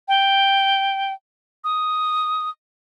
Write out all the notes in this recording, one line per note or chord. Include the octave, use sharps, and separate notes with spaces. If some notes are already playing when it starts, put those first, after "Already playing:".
G5
D#6